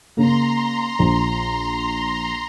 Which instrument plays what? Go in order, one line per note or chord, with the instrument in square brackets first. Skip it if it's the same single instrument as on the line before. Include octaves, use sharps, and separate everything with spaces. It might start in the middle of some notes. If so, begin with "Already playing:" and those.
[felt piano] C#3 A#3 [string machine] A#5 C6
[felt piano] A#1